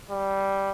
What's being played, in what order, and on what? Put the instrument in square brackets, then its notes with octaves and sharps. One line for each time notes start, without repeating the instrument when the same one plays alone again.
[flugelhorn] G3